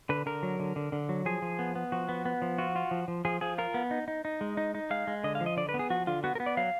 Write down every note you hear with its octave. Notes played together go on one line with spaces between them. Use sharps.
D3 B4
D3 A#4
F#3
D3
D3
D3
F#3
F3 G#4
F3
B3
B3
F3 F#4
B3
B3
F3
F4 F#4
F4
F3
F3
F3 G#4
F3 G#4
F4 A#4
B3
D#4
D#4
D#4
G#3
D#4
D#4
G#3 F5
G#3
D3 D#5
F5
F3
D#5
D3 D5
B4
B3
G#4
F3 F#4
D3 F4
B3 F#4
A#4
B3
D5
F#3 F5